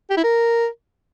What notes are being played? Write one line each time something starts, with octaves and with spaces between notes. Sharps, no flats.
G4
E4
A#4